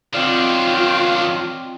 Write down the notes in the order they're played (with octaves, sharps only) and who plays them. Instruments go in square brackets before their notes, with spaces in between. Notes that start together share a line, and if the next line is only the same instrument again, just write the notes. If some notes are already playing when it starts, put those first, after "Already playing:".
[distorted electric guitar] D#3 D4 [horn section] F#3 F5 [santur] C4 D5 [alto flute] F4